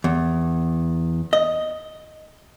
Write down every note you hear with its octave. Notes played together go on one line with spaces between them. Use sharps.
E2
D#5